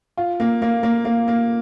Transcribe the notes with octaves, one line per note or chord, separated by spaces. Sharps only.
F4
A#3
A#3
A#3
A#3
A#3